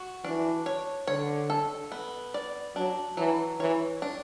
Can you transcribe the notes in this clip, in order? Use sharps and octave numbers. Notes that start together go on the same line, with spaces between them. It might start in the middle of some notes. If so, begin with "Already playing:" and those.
Already playing: F#4
E3 D4
C#5
D3 C#5
A4
B3
D5
F#3 D4
E3 F#3
E3 C#5
D4